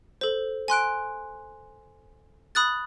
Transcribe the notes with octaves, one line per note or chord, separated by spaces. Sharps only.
A4 C5
G#5 C6 F#6 D7
B5 D#6 F#6 A6